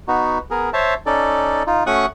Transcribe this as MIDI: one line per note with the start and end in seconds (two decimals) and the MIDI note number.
0.08 0.38 59
0.08 0.38 63
0.08 0.38 66
0.51 0.70 59
0.51 0.70 68
0.51 0.70 70
0.73 0.94 72
0.73 0.94 73
0.73 0.94 76
0.73 0.94 81
1.06 1.63 61
1.06 1.63 63
1.06 1.63 69
1.06 1.63 74
1.67 1.83 63
1.67 1.83 65
1.87 2.06 57
1.87 2.06 61
1.87 2.06 66
1.87 2.06 85
1.87 2.06 87
1.87 2.06 90